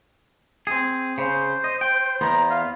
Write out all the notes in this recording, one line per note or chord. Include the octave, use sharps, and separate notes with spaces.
C4 G#4
C#3 C5
D#5
G5
E2 B3 C5 A#5
F5